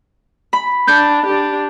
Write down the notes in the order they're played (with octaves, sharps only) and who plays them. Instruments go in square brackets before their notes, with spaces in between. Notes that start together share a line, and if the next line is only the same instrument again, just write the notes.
[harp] B5
[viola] D4 [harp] G6
[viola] D4 G4